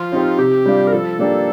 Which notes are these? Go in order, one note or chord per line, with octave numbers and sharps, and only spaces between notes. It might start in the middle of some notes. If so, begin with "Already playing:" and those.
Already playing: F3 F4
C4 D#4 G4
C3 G4
G3 D4 F4
A#4
F3 A4
A#3 D4 G4